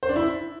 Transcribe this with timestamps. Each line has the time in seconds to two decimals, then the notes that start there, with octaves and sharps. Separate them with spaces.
0.03 C5
0.09 D4
0.16 E4